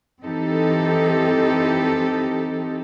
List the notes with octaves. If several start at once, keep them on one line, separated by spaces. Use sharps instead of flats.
E3 C4 D#4 G4 A4